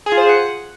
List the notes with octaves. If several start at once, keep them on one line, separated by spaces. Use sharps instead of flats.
G#4
F4
C5
G#4
F#5